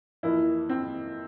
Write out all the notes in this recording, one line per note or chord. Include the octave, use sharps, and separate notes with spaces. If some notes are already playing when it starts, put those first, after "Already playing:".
F2 E3 A#3 E4
C4